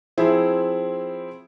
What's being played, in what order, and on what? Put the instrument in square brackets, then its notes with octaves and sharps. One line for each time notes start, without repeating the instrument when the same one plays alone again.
[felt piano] F3 C4 E4 G#4